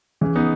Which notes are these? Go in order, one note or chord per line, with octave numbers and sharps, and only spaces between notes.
C#3 E3
B3 D#4